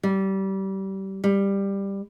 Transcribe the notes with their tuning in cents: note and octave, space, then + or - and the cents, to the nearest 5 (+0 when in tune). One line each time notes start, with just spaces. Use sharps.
G3 -25
G3 +10